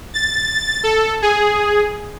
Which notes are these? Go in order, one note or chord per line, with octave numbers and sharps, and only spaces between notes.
A6
A4
G#4